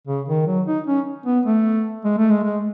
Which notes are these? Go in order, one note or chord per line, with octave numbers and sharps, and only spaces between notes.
C#3
D#3
F#3
D#4
C#4
B3
A3
G#3
A3
G#3
G#3